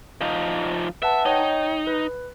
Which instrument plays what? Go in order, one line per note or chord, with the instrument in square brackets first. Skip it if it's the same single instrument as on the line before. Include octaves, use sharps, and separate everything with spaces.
[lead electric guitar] F3 D#4
[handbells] B4 F#5 A5 [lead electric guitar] E5
[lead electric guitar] D#4 [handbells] C#5 G5
[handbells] B4